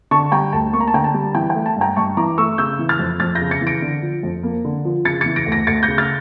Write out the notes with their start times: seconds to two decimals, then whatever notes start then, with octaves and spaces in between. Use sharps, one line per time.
0.11 D3 A5 C#6
0.32 G3 G5 A#5
0.53 D2 A5
0.73 A#3 C#6
0.80 A#5
0.88 A5
0.94 D3 G5 A#5
1.04 A5
1.14 G3
1.35 E3 G5
1.50 G5
1.55 A3
1.66 A5
1.77 G2 G5 A#5
1.96 G2 A5 C#6
2.17 E3 A#5 D6
2.38 A3 C#6 E6
2.58 C#3 E6 G6
2.79 E3
2.89 F6 A6
2.99 F2
3.20 F2 F6 A6
3.35 G6 A#6
3.41 C#3
3.51 A6 C#7
3.61 E3
3.67 A#6 D7
3.82 D3
4.02 F3
4.23 F2
4.43 A#3
4.65 D3
4.85 F3
5.05 C#3 A6 C#7
5.21 E3 A6 C#7
5.36 A#6 D7
5.46 D2
5.52 A#6 D7
5.67 D2 A6 C#7
5.83 G6 A#6
5.88 C#3
5.98 F6 A6